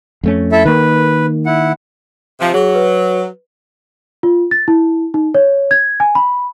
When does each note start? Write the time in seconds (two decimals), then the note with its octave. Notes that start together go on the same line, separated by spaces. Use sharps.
0.23 F2 A3 C#4
0.52 E4 A4 E5
0.65 D#3 A#3 B4
1.46 E4 F#5
2.40 C3 F3
2.54 F#3 G#4
2.75 B4
4.23 F4
4.51 A6
4.68 E4
5.14 D#4
5.34 C#5
5.71 G#6
6.00 G#5
6.15 B5